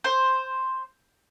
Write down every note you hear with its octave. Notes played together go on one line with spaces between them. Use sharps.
C5